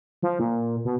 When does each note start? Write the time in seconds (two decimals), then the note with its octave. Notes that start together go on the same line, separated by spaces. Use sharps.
0.23 F3
0.40 A#2
0.85 B2